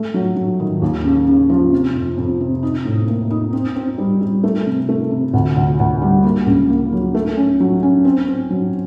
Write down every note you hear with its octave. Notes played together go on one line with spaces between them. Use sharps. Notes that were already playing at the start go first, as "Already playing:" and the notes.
Already playing: A3
F#3
F#3
D#3
D#2
C#3
C#3
F3
C3
F2
F2
C3
D#4
A2
A#3
D#4
C4
C4
G3
G3
A3
C3
A3
C3
D2
D2
D2
G3
A#3
C#2
A#3
F#3
A3
C#4
F#3
C#4
C4
C4
F#3